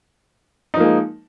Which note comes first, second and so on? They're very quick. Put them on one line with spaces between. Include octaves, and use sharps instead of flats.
D#4 F3 A#3 G#3